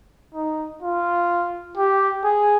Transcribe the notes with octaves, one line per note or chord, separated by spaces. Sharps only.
D#4
F4
G4
G#4